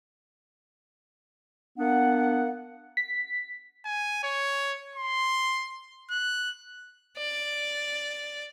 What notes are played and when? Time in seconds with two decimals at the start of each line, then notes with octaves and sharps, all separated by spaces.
1.78 A#3 B3 D4 F#5
2.97 B6
3.85 G#5
4.24 C#5
4.96 C6
6.10 F#6
7.17 D5